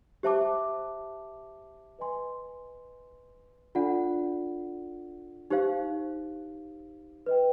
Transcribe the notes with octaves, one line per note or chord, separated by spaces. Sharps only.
G4 C5 E5 A5 D6
B4 D#5 G#5 C6
D4 F4 A4 D5 F#5
D#4 G4 C5 F5
B4 D#5 G5